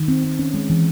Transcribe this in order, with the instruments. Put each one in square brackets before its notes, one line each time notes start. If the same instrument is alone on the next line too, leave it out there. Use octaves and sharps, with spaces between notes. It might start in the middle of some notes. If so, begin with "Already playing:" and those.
Already playing: [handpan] D#3
C4
C4
C#4
G#3
E3